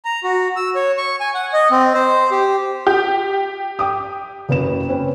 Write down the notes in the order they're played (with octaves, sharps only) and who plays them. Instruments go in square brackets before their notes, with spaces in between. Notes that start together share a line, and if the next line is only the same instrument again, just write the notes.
[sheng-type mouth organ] A#5
F#4
E6
C#5
C#6
G#5
F#5
D#5
C4
C5
G4
[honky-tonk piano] G4
[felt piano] G5 D6 D#6
F#1 B4 E7
C4 C#4 B4